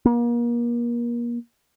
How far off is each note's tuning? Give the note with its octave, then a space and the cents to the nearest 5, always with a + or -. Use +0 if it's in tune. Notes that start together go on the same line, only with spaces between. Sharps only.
A#3 +35